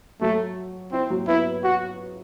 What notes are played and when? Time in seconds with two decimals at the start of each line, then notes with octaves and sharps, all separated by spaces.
0.21 F#3 A3 F#4
0.92 C4 E4
1.10 F#3 F#4
1.28 B3 E4 B4
1.64 F#4